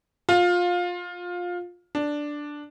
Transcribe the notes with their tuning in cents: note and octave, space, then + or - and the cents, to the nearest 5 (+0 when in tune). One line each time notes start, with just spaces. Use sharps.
F4 +20
D4 +0